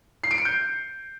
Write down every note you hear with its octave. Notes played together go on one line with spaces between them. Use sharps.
C7
D7
C#7
G6